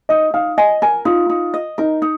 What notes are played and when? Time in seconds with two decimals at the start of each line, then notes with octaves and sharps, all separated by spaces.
0.09 D#4 D#5
0.34 D#4 F5
0.58 D#5 G#5
0.82 A#4 G#5
1.05 D#4 F4
1.29 D#4
1.54 D#5
1.78 D#4 A#4
2.02 D#4